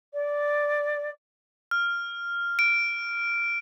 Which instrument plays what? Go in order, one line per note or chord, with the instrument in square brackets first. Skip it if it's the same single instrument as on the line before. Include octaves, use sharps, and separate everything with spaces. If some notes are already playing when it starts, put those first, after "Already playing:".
[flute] D5
[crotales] F6
D7